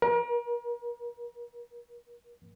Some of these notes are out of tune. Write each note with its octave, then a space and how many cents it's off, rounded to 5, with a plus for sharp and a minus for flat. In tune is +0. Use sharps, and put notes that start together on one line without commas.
A#4 +40